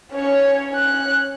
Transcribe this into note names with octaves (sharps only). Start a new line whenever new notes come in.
C#4 C#5
C#4 F#6